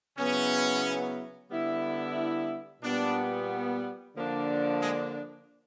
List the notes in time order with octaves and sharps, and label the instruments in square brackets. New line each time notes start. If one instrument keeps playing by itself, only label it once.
[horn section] C#3 F#3 B3 E4 [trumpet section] C#4
[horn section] D3 G3 B3 E4
[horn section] A#2 G3 B3 [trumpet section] D4
[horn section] D3 F3 A#3 D4
[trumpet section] G#3